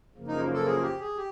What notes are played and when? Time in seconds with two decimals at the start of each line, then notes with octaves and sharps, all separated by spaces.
0.16 F#2 C#3 F3 A#3
0.28 D#4
0.53 A4
0.66 G#4
0.82 G4
1.00 G#4
1.17 G4